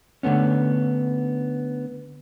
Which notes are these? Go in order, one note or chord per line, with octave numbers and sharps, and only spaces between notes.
D3 A3 B3 C#4